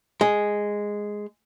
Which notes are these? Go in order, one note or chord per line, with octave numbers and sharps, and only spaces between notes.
G#3